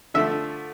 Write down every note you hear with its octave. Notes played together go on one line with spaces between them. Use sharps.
D3 F3 A3 E5